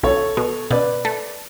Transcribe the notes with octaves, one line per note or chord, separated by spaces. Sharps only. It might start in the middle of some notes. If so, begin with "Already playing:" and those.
B1 A4 C#5
B2
B2 B4 D5
A3